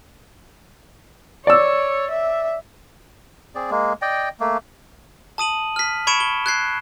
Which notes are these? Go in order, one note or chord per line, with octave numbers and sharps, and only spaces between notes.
C#5 D5 E6
E5
C4 G#4 D5
G#3 A#3
D5 D#5 G5
A3 A#3
A5 D#6 D#7 F#7
F6 B6
B5 C#6 G#6 C#7 D7 E7
G7
F#6 G#6 C7